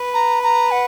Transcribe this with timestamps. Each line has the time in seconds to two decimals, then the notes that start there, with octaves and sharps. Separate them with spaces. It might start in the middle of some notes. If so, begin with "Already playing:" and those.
Already playing: B4
0.14 A#5
0.43 A#5
0.71 F#5